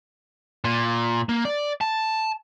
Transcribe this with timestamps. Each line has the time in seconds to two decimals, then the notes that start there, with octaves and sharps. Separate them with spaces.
0.64 A#2
1.29 A#3
1.45 D5
1.81 A5